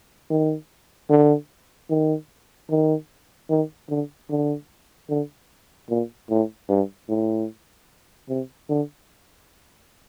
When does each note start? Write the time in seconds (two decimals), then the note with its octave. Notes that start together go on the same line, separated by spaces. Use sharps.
0.30 D#3
1.10 D3
1.90 D#3
2.70 D#3
3.50 D#3
3.89 D3
4.30 D3
5.09 D3
5.90 A#2
6.30 A2
6.69 G2
7.09 A2
8.28 C3
8.69 D3